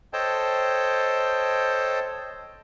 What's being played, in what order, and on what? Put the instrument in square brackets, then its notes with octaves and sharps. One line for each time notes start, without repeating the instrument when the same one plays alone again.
[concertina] A4 C5 C#5 D#5 G5 A5